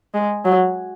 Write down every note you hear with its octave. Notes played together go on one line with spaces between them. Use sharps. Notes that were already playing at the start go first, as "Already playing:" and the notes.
G#3
F#3